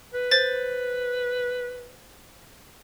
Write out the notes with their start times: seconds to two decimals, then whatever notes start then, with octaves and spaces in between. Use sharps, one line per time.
0.14 B4
0.31 C5 A6